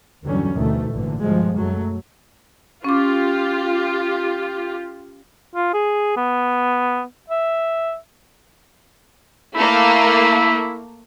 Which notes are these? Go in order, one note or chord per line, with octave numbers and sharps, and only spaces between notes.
E2 G2 D3 F#3 G3 C#4
D2 B2 D#3 E3 A3
G#1 G2 A#2 D3 E3
G2 B2 D3 F3 G3 G#3
F#2 F#3 A3
C#4 F4 G4 D6
F4
G#4
B3
E5
A3 A#3 E4